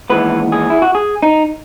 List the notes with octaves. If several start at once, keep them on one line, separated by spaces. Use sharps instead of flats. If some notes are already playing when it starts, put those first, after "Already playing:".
D#2 C#3 E3 G#3 B3 B4
G#4
E4
F#4
G#4
D#4